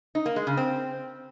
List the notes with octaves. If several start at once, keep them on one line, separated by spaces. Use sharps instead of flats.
D#4
A#3
G#3
C#3
C4